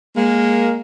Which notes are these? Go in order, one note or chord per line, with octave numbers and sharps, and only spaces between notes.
G#3 A#3